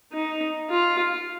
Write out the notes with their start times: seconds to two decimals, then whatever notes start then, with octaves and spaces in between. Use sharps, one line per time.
0.13 D#4
0.70 F4